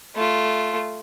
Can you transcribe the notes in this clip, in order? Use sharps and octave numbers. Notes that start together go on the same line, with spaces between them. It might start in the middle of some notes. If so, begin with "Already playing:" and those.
A3 F4